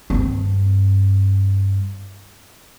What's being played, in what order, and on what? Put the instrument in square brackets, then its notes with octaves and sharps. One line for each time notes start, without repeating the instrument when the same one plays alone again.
[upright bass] G2 C4